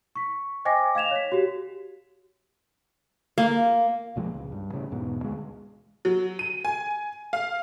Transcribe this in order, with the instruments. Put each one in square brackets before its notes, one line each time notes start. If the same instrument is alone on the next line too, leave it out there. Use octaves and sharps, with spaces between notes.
[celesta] C#6 B6
C5 D#5 G5 G#5 D6 A#6
F5 G#6 E7 F7
C#5 B6
F#4 G4
[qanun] A#3
[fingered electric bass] B1 A#2 F3 G#3
C#2
G2
A2 C#3
E2 G#2 B2
D2 G#3
[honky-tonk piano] F#3
D#7
G#5
F5